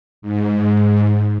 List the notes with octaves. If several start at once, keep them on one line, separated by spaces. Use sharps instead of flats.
G#2